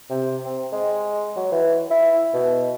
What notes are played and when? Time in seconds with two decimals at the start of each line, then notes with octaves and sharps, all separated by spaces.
0.10 C3
0.45 C4
0.72 G#3
1.36 F#3
1.52 E3
1.91 E4
2.34 B2